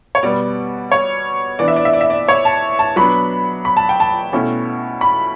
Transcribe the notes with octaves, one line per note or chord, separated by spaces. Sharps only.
C#5
B2 G3 B3 D5
C#5
E3 B3 D4 D5
E5
D5
E5
D5
E5
D5
C#5
A5
A5
F#3 B3 D4 B5
B5
A5
G5
A5
B2 A3 C#4 E4
B5